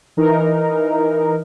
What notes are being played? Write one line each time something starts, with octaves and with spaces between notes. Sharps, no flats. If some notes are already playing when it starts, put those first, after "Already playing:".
E3 D#4 A#4